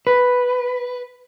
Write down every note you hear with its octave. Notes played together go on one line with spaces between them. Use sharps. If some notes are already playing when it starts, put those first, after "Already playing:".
B4